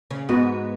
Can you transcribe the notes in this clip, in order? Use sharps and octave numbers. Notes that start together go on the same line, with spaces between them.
C#3 C#4
G#2 G#3 B3 F#4 B4